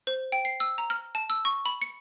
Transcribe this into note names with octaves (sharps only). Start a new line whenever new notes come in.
C5
G5
C7
E6
A#5
F6
A5
E6
C#6
B5
C#7